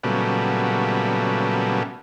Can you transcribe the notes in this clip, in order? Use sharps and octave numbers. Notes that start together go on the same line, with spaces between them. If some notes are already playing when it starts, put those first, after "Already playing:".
A#2 C#3 F#3 G3 A3 B3